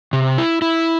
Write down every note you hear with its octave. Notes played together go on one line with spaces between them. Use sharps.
C3
E4
E4